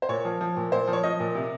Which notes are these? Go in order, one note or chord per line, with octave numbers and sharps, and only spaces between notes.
C5
A#2 C#5
F3
F3
A#2
A#2 C5
F3
C#5
F3 D#5
A#2
C3